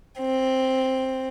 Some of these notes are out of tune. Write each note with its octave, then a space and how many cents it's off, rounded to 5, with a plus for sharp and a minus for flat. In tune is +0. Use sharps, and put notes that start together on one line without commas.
C4 +5